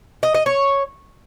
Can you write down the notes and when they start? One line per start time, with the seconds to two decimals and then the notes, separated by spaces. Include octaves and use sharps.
0.23 D#5
0.34 D#5
0.46 C#5